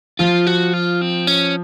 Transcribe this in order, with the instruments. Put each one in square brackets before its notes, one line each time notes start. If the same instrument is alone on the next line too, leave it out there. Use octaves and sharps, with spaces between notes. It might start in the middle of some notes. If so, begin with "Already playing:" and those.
[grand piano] F3 [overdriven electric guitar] F4
[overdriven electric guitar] F#4
F4
C4
C#4